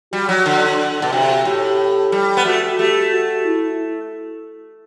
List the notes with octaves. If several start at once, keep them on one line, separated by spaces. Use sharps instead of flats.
G3 F#4
F#3
D3
B2
C3 F#4
A2 G4
G3
B3
A3 F#4
A3 G4
F#4
E4